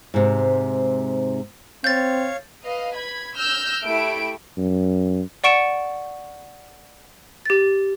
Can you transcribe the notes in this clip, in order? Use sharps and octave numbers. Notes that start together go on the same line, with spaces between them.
G#2 C3
C4 C#5 F5 G6 A6
B4 D#5 F5
B5 G#6
E6 F6 G6 A#6
A3 E4 G4 E5 D7
F#2
D5 F#5 C#6 C#7 D7 E7
G4 A6